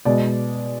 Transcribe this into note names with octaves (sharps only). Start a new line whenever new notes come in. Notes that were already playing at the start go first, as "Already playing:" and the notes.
B2 G#3 D5